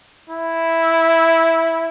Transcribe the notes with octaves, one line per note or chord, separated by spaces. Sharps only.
E4